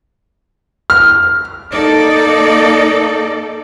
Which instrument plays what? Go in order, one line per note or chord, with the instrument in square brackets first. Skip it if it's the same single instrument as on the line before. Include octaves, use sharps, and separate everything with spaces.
[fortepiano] F6
[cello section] A#3 D#4 A4 D5